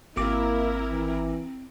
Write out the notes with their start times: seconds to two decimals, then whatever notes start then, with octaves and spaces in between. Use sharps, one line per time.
0.17 G#1 A#3 C4 E4 A#4 D6
0.89 E3